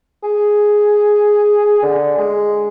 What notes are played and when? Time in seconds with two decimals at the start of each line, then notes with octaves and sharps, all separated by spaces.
0.23 G#4
1.83 D3
2.18 G#3